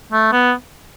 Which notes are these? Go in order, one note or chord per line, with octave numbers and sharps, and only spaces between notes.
A3
B3